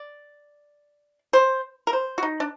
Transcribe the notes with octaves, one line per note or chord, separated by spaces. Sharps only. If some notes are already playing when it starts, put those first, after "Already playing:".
Already playing: D5
C5
A#4
C5
F#4
D#4
D4